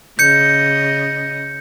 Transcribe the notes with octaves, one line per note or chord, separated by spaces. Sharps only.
C#3 D#5 G6 C#7